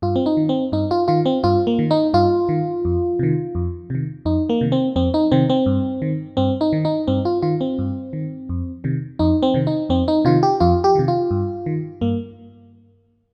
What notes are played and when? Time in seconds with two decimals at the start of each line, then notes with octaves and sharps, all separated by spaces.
0.02 G2 F4
0.16 C4
0.26 D#4
0.37 D#3
0.49 C4
0.72 G2 D#4
0.91 F4
1.08 D#3 F4
1.26 C4
1.44 G2 F4
1.67 A#3
1.79 D#3
1.91 D#4
2.14 G2 F4
2.49 D#3
2.85 F2
3.19 C3 D#3
3.55 F2
3.90 C3 D#3
4.25 F2 D#4
4.49 A#3
4.61 C3 D#3
4.72 C4
4.96 F2 C4
5.14 D#4
5.32 C3 D#3 C4
5.50 C4
5.66 G2
6.02 D#3
6.37 G2 C4
6.61 D#4
6.73 D#3
6.85 D#4
7.07 G2 C4
7.25 F4
7.42 D#3 F4
7.61 C4
7.79 G2
8.13 D#3
8.49 F2
8.84 C3 D#3
9.19 F2 D#4
9.43 C4
9.54 C3 D#3
9.67 D#4
9.89 F2 C4
10.08 D#4
10.25 C3 D#3 F4
10.43 G4
10.60 F2 F4
10.84 G4
10.95 C3 D#3
11.08 F4
11.31 G2
11.66 D#3
12.01 G2 A#3